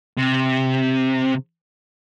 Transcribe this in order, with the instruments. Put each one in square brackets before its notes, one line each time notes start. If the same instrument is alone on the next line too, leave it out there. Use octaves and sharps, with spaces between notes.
[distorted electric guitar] C3